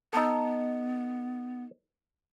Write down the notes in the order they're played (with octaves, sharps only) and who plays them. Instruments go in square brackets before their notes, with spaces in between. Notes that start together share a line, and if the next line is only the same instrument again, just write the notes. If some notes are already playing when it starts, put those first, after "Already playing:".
[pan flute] B3 [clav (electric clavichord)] D#4 A4